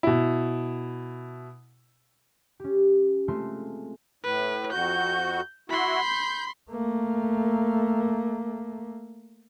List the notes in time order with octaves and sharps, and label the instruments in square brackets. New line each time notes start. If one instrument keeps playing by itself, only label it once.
[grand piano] B2 E4
[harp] C#4 G4
G#3 A3 C4 F4 C6
[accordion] A2 [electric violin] B4
[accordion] F2 F#4 [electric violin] G6
[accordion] E4 F#4 [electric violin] B5 C6
[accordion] G6
[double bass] A3 A#3